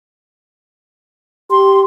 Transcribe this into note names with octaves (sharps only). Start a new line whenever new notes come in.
G4 C6